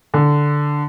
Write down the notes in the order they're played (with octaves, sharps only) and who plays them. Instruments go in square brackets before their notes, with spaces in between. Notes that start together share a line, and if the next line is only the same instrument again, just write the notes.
[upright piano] D3